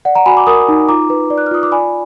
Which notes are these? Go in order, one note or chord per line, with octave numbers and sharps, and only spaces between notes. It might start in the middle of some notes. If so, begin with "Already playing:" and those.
D5 F#5
F#5 A#5
F#4 G#5 B5
A#5 D6
A#4 B5 D#6
D#4
F4 A#5 D6
B4
D5
F#6
F6
F4 D#6
D6
D5 G#5 B5